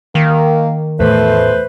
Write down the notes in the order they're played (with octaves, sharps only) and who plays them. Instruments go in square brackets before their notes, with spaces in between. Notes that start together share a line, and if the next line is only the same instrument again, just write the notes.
[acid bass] D#3 [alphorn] A#3
[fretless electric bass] E2 A2 [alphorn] A3 [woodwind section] B4 C5